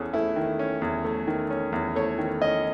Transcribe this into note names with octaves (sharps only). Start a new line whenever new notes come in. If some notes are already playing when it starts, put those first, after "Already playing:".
Already playing: E2 C#4 G#4 A4
A3 E4
D#3
C#4
E2
A3
D#3
C#4
E2
A3 C#5
D#3
C#4 D#5